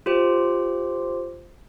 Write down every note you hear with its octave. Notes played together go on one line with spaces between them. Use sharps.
F4 G4 C5